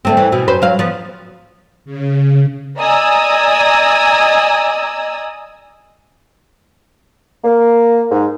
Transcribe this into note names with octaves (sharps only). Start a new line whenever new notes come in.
D3 A3 C4
E3
B2 E3 E4
F#2 B4 C5
F#3 F5
F3 B3
C#3
D5 D#5 G#5 A#5 D#6 E6
A#3
G#2